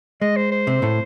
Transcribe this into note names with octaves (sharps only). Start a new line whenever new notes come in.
G#3 D#5
C5
C5
C3 C4
A2 A3